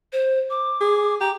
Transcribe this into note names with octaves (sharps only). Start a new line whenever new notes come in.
C5
D6
G#4
G4 A#5